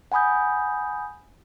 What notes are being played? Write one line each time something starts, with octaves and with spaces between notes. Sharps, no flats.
F#5 G#5 B5 D#6 G6